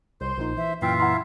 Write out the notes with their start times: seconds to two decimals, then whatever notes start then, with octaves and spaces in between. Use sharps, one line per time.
0.21 C2 C5 C6
0.38 A#1 A#2 D#4
0.57 E3 E5
0.82 F#2 A#2 E3 F4 E5 F5 G5
1.00 E4 F#5 A#5 C6